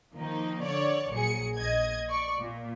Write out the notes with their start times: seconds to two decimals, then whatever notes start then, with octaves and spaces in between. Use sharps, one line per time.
0.14 D#3 F3 A#3 D#4
0.62 D3 C#5 D5
1.11 A#1 F#3 G#4 C#7
1.58 A#1 D#5 G#6
2.09 D5 C#6
2.39 A#2